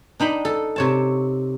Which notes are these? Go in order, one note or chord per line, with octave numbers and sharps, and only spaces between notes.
D4 D#4 G5 B5
A4
C3 C#5 A5